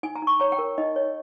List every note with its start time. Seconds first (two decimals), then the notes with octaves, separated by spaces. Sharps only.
0.03 D#4 G#5
0.15 A#5
0.22 D#4
0.27 C#6
0.40 C#5 A#5
0.52 G5
0.59 A#4
0.78 D#4 D#5
0.96 C#5